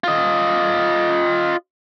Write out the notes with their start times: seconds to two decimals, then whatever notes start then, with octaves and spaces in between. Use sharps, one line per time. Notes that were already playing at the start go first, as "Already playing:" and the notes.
0.04 F4 D#5